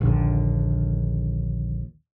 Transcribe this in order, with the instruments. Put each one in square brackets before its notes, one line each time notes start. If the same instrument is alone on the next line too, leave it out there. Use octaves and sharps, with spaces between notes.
[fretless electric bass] A#1 D#2 D3